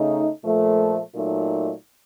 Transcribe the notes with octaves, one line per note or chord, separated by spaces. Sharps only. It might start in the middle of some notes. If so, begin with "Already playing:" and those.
Already playing: C#3 A3 D#4
A#2 F3 A3
A#2 F#3 A3 D#4